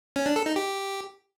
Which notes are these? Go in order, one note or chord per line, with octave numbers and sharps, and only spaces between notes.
C#4
D4
A4
D#4
G4